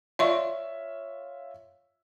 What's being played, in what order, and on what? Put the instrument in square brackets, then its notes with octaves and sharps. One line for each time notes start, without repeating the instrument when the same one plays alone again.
[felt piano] F4 C#5 E5 [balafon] D5 C6 C#6